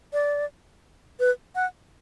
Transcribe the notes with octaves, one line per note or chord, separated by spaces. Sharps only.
D5
B4
F#5